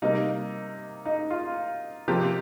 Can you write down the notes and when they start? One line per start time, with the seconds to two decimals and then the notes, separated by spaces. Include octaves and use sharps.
0.02 C3 G3 A#3 D#4
1.05 D#4
1.30 F4
2.08 C3 F3 A#3 G4